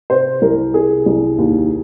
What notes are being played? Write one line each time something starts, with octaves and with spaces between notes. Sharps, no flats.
C3 C5
C2 A#4
C3 G#4
C2
D#2